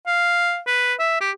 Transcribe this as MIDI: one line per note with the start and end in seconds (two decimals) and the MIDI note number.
0.07 0.59 77
0.67 0.94 71
0.99 1.19 76
1.21 1.31 67